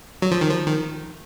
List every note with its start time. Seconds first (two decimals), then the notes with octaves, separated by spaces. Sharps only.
0.22 F#3
0.32 F3
0.41 D#3
0.50 F3
0.67 D#3